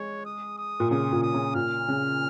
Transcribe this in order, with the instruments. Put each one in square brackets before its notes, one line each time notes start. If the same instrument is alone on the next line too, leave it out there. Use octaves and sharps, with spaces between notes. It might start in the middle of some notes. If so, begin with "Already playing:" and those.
Already playing: [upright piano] G#3 [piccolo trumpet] C#5
[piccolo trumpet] D#6
D#6
[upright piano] A#2
[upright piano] C#3 [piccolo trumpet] D#6
[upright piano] A#2
[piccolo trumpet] D#6
[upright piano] C#3
[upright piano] A#2 [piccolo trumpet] F6
[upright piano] C#3